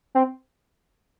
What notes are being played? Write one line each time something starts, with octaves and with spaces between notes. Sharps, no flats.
C4